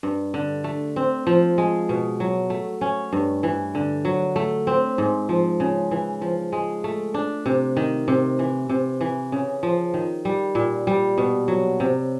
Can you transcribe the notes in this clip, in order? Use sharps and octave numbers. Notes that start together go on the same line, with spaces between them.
G2
D3
A3
C4
F3
G#3
B2
F#3
A3
C#4
G2
E3
D3
F#3
A3
C4
G#2
F3
C#3
E3
F3
G#3
A3
D4
C3
D#3
C3
E3
C3
E3
C#3
F3
D#3
G3
A#2
G3
B2
F#3
C3